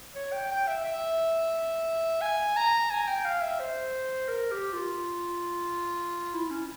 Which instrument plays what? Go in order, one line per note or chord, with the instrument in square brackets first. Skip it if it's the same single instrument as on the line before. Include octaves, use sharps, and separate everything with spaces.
[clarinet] C#5
G5
G5
E5
E5
G#5
A#5
G#5
G5
F5
E5
C5
A#4
G4
F4
E4
C#4